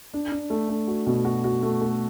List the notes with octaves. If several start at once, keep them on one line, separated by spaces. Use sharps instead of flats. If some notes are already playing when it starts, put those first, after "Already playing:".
D4
D4
A3
A3
F#4
B2
F#4
F#4
A3
A3